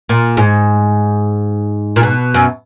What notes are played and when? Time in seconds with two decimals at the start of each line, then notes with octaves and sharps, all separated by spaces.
0.09 A#2
0.37 G#2
1.96 A#2
2.03 B2
2.34 F#2